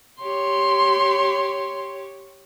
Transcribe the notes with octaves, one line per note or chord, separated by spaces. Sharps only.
G4 C#5 C6